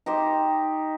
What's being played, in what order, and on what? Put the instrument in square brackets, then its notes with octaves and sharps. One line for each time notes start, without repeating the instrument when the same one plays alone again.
[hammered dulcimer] D#4 G4 C5